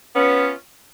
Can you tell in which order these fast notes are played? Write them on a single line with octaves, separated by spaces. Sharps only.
B3 C#4 F4